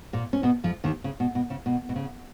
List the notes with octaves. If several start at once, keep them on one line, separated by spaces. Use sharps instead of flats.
A#2 A#3
C#4
B2 B3
F2 F3
D#2 D#3
C#3
B2
B2
C#3
B2
B2
C#3